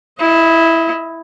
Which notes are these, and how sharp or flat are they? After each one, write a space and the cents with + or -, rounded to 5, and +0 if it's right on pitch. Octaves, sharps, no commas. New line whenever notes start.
E4 +0 D#5 +30